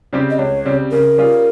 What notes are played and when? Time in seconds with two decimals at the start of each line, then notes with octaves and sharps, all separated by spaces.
0.13 C#3 G3 C4 G4
0.30 D#5
0.38 C#2 C#5
0.66 C#3 G3 C4 G4
0.91 C#3 A#4
1.18 G3 C#4 F4 G#4